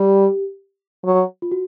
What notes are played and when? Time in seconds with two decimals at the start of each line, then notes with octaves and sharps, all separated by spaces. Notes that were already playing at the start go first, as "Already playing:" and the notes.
Already playing: G3 G4
1.04 F#3
1.42 F4
1.52 F#4